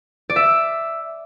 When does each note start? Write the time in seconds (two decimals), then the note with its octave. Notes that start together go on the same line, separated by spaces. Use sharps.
0.29 D5
0.36 E5